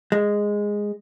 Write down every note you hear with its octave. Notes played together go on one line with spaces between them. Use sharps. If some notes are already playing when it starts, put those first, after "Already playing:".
G#3